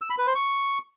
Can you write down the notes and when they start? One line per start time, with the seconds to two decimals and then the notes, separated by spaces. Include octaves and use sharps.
0.02 E6
0.10 B5
0.18 B4
0.27 C5
0.35 C#6